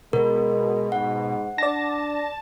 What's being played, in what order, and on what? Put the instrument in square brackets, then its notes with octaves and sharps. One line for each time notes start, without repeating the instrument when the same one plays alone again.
[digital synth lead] B2 [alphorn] G#3 [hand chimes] A#4
[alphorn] G#2 [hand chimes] F#5
[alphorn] D4 [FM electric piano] D5 A#6 [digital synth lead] A5